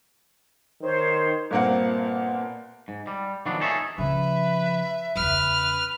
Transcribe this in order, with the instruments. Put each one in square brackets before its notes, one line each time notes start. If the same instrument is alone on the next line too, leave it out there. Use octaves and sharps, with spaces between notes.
[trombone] D#3 [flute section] C5 C#5
[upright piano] G1 A#2 A#3 C4 F#5
[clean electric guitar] G#2
G3
D#3 F3 F#3 A3 B3 D4
D#4 G#4 A4 C#5 D#5 E5
[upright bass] C#3 F3 [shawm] B4 [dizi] E5
[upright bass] E2 C#3 [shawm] B4 [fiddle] F6